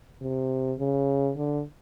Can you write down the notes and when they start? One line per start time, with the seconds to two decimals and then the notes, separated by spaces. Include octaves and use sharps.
0.21 C3
0.79 C#3
1.37 D3